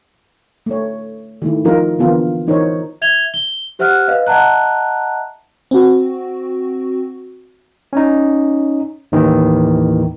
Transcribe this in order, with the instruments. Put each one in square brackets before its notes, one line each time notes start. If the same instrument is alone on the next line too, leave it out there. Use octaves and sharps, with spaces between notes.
[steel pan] A3 C#5
D#3 A3 E4
F3 D#4 F4 A#4
D3 E3 B3 F4 A#4
E3 D#4 A#4 C5 C#5
[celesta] E5 G#6 F7 G7
G7
G4 C5 E5 F#5 F6 F#6
B4 D#5 F5
D#5 E5 F#5 A5 A#5 F#6
[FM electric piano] C4 F#4
[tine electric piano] C#4 D#4
D#2 A2 D#3 E3